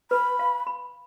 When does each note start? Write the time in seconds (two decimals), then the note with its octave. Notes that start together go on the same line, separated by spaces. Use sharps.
0.11 B4 B5
0.39 F5
0.67 B5